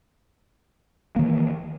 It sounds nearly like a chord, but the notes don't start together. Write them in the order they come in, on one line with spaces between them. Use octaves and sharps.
A#3 D#3 E3